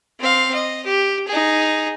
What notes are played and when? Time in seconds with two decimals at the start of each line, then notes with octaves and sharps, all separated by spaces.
0.20 C4 F5
0.54 D#5
0.86 G4
1.28 D#4 G#4